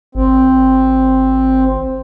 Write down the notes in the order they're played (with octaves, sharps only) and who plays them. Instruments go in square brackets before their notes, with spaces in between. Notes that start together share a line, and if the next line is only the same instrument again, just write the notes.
[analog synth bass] G#1 [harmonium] C4